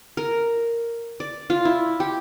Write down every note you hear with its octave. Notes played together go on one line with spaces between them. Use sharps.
A#4
D5
F4
E4
G4